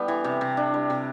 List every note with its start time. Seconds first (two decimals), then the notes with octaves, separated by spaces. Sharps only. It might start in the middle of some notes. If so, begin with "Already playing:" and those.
Already playing: G3 B3 E4 G5 A5
0.08 E3
0.24 C3
0.41 C3
0.57 D4
0.74 G3
0.90 C3